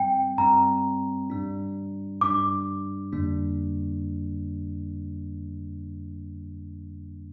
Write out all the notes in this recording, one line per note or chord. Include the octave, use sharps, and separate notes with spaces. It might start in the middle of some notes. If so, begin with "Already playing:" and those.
Already playing: G2 G3 C4 G5
G2 G3 C4 A#5
G2 G3 D4
G2 G3 D4 D6
F2 D3 G3 A#3 D4